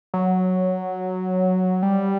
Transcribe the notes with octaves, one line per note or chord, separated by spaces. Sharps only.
F#3
G3